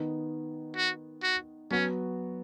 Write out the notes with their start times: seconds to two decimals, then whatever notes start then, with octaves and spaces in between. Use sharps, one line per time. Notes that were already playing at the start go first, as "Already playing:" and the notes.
Already playing: D#3 B3 D#4
0.76 F#4
1.23 F#4
1.71 F#3 B3 C#4 F#4